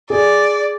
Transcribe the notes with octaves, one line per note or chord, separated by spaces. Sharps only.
G#4 D5